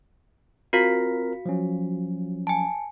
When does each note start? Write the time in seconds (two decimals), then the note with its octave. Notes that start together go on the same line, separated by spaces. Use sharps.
0.73 C4 F4 F#4 A#4 F5 B6
1.46 F3 F#3 C#4
2.47 G#5 A5